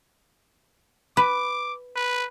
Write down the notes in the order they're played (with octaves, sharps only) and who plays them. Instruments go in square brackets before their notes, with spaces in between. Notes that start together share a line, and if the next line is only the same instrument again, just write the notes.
[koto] B4 [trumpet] D6
[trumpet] B4